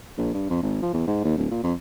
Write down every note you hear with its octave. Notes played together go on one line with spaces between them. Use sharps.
A#1
G2
F2
G#1
F3
E2
G#2
D#2
D1
A#2
F2